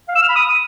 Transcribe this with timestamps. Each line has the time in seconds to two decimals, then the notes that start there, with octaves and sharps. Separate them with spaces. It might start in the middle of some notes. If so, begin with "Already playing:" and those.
0.08 F5
0.15 E6
0.22 F6
0.29 B5
0.36 D#6